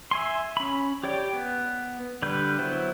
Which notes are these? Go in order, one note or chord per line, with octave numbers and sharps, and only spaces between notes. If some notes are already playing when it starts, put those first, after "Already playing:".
E5 G#5 C6
C#4 B5
G4 C#5 D5 G5
B3
D3 G3 B4 G6
F#3 B3 E4 C5